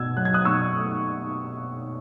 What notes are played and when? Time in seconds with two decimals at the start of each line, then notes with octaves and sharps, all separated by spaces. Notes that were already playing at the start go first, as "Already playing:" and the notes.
Already playing: B2 A3 E6 G#6
0.17 F#3 F#6
0.25 G#6
0.34 D#6 F#6
0.45 B2 C#6 E6
0.75 A3